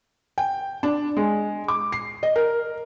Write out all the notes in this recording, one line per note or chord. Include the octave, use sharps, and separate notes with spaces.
G5
D4
G#3
D6
C7
D#5
A#4